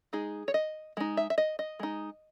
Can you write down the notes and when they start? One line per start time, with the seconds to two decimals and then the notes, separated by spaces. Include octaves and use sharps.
0.13 G#3 D#4 G#4
0.48 C#5
0.54 D#5
0.97 G#3 D#4
1.17 E5
1.30 E5
1.38 D#5
1.59 D#5
1.79 G#3 D#4